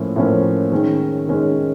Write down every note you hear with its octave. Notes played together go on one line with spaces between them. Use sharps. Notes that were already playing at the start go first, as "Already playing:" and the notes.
Already playing: A2 F3 A#3 C#4
A2 F3 A#3 C#4
D#3 G#3 C#4
D#3 G#3 C#4